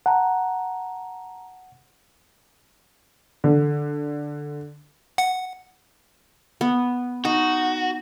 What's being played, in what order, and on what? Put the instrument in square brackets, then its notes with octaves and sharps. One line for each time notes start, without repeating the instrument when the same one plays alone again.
[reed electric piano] F#5 [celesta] A5 A#5
[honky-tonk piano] D3
[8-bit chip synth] F#5
[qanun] B3
[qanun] D#4 [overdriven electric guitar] F#4